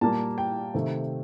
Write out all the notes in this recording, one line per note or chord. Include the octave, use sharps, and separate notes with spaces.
A#2 G3 A#3 A5
G5
C3 D#3 A3 C4